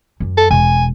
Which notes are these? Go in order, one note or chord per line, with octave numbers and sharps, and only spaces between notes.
F#2
A4
E1 G#5